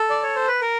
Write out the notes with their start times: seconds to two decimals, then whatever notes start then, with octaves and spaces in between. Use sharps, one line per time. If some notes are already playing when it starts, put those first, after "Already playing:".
Already playing: A4
0.10 D5
0.23 C#5
0.36 C5
0.48 B4
0.61 A#4